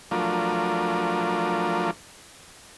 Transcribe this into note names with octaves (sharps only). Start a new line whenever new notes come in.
F3 F#3 A3 D4 F4 A#4